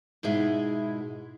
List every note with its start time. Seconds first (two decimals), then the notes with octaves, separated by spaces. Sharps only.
0.23 G#2 B2 G#3 E4